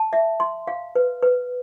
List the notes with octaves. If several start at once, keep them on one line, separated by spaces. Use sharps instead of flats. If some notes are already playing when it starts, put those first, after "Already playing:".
Already playing: A5
E5
C6
F5
B4
B4